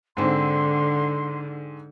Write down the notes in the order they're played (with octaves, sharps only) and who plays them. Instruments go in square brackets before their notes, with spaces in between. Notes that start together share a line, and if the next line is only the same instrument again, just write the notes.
[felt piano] G#2 C4 [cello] D3 [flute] C6